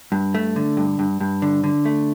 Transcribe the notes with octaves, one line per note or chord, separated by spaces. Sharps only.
G2
A3
D3
G2
G2
G2
D3
D3
A3